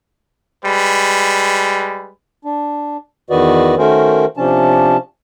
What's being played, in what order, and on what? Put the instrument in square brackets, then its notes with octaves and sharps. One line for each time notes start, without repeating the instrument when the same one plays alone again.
[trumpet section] G3 G#3 B4
[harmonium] D4
E2 D#3 F#4 B4 D5 D#5
D#3 A3 C#4 F#4 A#4 C5
C3 F3 C#4 D4 A5